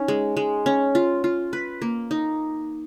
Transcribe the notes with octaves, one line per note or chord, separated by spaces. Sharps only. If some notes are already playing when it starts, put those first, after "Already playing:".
Already playing: C#4 D#4
G#3
G#3
C#4
F4
F4
B4
A#3
D#4